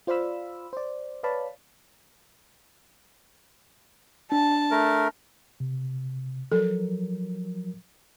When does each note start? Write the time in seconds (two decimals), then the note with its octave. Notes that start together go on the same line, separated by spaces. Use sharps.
0.07 F4 C5 D5 F5 B5 E6
0.73 C5 D5
1.23 B4 C#5 D5 F5 A5 B5
4.32 D4 A5
4.71 A3 A#4
5.60 C3
6.52 F3 F#3 A4 A#4